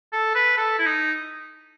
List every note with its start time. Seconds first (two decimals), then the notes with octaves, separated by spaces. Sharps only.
0.13 A4
0.35 B4
0.57 A4
0.79 E4
0.86 D#4